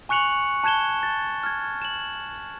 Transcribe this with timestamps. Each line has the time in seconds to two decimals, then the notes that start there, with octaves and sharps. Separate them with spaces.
0.09 G#5 C#6 F#6 C#7 F7 F#7
0.64 A5 F#6 G#6 E7 G7
1.03 A6
1.43 F6 G#6
1.82 E7 F#7